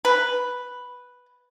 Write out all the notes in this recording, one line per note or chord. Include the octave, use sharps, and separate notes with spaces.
B4